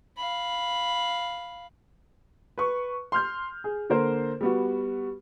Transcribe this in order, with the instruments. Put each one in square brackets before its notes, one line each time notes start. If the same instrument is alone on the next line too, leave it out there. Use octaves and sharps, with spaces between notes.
[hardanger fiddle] F5 B5
[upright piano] B4 C#6
C6 F6 G6
G#4
D3 A#3 A#4 C5
G3 B3 F#4